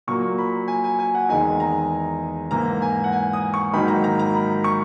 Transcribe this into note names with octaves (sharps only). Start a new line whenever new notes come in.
A#2 F#3 A#3 C#6
B5
G#5
G#5
G#5
F#5
E2 D#3 G#3 D#4 G#5
A#5
G#2 E3 A#3 A#5
G#5
F#5
G#5
D#6
C#6
G#2 D#3 F#3 A#3 D#4 B5
A#5
A#5
A#5
B5
C#6